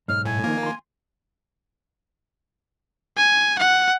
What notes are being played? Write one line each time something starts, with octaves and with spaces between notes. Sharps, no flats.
B1 G#2 C#5 F6
A2 G#5
D#3 F3 A#3 F4
A#5 C6
G#5
F#5